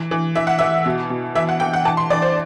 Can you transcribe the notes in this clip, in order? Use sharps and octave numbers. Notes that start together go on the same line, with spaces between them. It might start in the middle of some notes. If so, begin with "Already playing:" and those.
Already playing: E3
E3
E3 E5
F#5
E3 E5
B2
B2
E3 E5
F#5
E3 G5
F#5
E3 A5
C6
E3 D5
C5